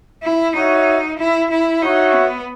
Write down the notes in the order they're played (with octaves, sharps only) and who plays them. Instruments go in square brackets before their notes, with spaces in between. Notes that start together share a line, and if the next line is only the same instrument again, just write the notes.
[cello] E4
[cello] D#4 [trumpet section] F#4 C#5 E5
[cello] E4
E4
[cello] D#4 [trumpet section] F#4 C#5 E5
[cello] B3